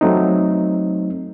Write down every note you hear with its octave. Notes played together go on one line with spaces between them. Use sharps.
F#3 A3 C4 D#4